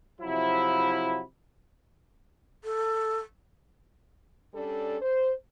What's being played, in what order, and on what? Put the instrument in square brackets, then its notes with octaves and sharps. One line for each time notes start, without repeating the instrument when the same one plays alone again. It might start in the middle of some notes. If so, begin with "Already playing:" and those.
[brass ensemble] C3 F3 F#3 E4
[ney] A4
[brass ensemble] G3 C#4 D4 A4
C5